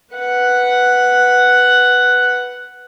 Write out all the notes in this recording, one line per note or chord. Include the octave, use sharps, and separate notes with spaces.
B4 F#5